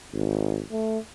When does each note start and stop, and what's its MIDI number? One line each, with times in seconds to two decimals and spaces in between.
0.13 0.62 32
0.71 0.98 57